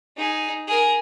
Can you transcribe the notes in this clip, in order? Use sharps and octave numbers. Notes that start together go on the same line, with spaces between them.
D#4 G#4
G#4 A#4